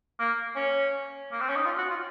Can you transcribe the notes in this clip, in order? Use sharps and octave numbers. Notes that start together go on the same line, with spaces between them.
A#3
C#4
A#3
C4
C#4
D#4
F4
F#4
F4